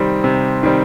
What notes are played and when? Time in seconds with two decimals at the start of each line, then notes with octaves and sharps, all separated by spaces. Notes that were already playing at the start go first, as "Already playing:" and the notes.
Already playing: C3 D#3 G3 C4
0.24 C3
0.63 D#3 G3 C4